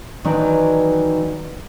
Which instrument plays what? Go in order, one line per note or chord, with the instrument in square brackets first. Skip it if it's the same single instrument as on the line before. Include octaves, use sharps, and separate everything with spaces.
[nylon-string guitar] D#3 E3 F#3 D4